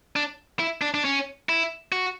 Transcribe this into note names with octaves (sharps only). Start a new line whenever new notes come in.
D4
E4
D4
D4
C#4
E4
F#4